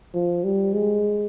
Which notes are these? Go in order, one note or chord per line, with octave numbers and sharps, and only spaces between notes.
F3
G3
G#3